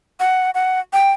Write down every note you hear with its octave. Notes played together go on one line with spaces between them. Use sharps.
F#5
F#5
G5